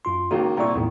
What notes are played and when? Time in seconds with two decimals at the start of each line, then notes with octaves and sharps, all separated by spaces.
0.05 F#2 F4 C6
0.31 C#2 D#3 A#3 F#4
0.57 C2 A#2 E4 A#5 C#6
0.75 E2 A2 D#3